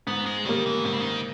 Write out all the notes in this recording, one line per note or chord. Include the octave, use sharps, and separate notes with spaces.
G#2 B3
G#3
D#3 G3 A#3
E3
G#2 D#3
C#3
D#3